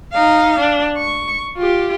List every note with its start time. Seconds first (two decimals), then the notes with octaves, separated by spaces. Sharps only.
0.13 D#4 F5
0.59 D4
0.98 C#6
1.58 F4 G4